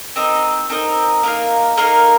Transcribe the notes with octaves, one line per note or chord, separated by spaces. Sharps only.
C4 D#4 A#4 D#5
C4 D#4 A#4 D#5
A#3 D#4 A#4 F5
A#3 D#4 A#4 F5